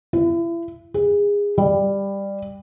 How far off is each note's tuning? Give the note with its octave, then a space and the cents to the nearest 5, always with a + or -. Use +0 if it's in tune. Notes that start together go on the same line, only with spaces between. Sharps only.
E4 +35
G#4 -25
G3 +15